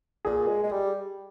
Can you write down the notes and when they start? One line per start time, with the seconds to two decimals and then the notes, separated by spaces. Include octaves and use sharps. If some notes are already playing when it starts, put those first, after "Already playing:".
0.25 A#2 G#4
0.48 G#3
0.63 G#3
0.72 G3